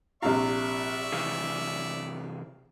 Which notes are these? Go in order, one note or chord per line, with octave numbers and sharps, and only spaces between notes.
A#1 C3 E4 G4 D5 E5 F5 C#6
C3 E3 G#4 F5